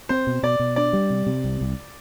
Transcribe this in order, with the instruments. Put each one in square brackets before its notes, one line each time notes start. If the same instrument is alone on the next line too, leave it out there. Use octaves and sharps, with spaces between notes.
[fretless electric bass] C4 [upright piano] C5
[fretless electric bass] B2
[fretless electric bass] B2 [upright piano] D5
[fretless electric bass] B2
[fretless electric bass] D4 [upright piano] D5
[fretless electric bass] G3
C3
C3
C2
C2